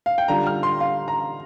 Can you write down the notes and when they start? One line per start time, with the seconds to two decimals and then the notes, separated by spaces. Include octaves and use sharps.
0.06 F5
0.18 G5
0.28 D3 G3 D4 F4 A#5
0.47 F6
0.63 C6
0.80 F5
1.08 A#5